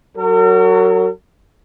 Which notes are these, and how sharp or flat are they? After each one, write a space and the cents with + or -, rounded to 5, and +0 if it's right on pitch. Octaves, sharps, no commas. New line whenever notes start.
F#3 +10 A#4 -45